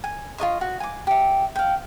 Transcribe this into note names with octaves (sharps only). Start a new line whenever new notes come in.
G#5
F4 A#4 D#5 C#6
F#4
G#5 D6
G4 E5
F5 G5